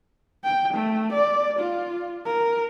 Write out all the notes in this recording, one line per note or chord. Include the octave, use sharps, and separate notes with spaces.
G5
A3
D5
F4
A#4